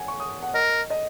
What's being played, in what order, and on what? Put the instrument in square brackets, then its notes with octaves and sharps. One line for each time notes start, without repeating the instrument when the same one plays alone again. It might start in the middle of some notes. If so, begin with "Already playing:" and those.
Already playing: [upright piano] F#5 G#5
C#6
D#6
F#5
[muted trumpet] A#4 [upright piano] D#5
[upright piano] D#5